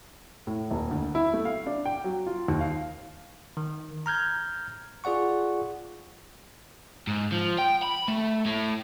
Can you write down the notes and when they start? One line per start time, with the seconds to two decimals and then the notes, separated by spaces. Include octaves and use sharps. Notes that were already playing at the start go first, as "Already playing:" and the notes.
0.47 A2
0.71 D#1
0.91 D2
1.15 E4
1.34 A3
1.45 F5
1.66 D4
1.86 G5
2.04 F#3
2.27 F4
2.48 D#2
2.61 F5
3.57 D#3
4.06 A#5 F6 G6 G#6
5.04 F4 G#4 D5 F#5 C#6
7.07 G#2
7.32 F3
7.58 G5
7.83 B5
8.08 A3
8.45 A2